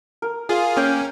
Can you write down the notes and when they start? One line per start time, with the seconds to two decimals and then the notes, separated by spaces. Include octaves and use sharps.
0.22 A#4
0.49 F4 G#4 F5
0.77 A#3 C#4 G5